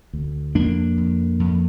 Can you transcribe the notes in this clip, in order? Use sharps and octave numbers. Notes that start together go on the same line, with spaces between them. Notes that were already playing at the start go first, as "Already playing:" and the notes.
D2
F2 A#3 D4
F2
F2